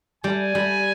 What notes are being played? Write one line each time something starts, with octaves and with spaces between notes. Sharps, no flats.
G3 G#5
G3